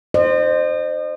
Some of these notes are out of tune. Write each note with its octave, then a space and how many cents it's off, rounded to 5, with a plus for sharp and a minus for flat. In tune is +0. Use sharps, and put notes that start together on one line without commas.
C5 +0 D#5 -40